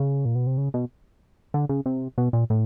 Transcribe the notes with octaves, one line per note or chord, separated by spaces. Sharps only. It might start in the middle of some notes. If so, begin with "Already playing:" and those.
Already playing: C#3
A#2
B2
C3
C#3
B2
D3
C#3
C3
B2
A#2
A2